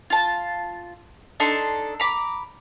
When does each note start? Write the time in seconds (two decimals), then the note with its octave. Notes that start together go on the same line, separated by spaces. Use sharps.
0.10 F4 A5
1.40 D4 D#4 A4 C6
2.00 A#5 B5 D6